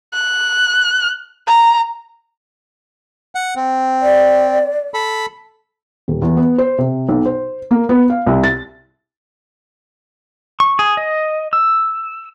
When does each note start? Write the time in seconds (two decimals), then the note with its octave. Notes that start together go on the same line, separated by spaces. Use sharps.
0.14 F#6
1.47 A#5
3.35 F#5
3.56 C4
4.02 D5
4.94 A4 B5
6.08 D#1
6.22 E2
6.37 B3
6.58 C5
6.78 C3
7.09 B1
7.26 C5
7.71 A#3
7.89 B3
8.10 F5
8.26 C2
8.44 A6
10.60 C#6
10.79 G#4
10.97 D#5
11.53 E6